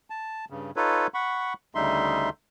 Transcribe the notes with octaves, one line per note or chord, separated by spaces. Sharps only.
A5
G2 C#3
D#4 F4 A4 B4 C#5
F#5 B5 C#6
D2 C#3 G3 D#4 E5 C6